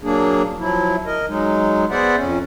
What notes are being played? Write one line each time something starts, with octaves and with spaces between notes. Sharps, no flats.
F#3 A#3 D4 G#4
F3 F#3 E4
A#4 D#5
F#3 G#3 D#4
B3 G#4 C5 D5 E5 F#5
F2 C#4